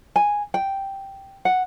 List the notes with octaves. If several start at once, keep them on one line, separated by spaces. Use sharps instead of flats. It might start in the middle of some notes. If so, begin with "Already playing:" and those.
G#5
G5
F#5